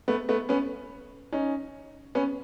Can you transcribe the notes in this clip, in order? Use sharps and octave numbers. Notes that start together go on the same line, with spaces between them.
A3 B3
A3 B3
B3 C#4
C#4 D#4
B3 C#4